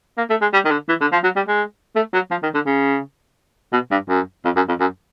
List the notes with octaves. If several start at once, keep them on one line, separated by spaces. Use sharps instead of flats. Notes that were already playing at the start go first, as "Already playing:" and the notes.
A#3
A3
G#3
G3
D#3
D3
E3
D3
F3
F#3
G3
G#3
A3
F#3
F3
D#3
D3
C#3
B2
G2
F#2
F2
F#2
F2
F#2